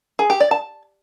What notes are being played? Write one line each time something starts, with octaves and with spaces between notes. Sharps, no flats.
G#4
G4
D5
A5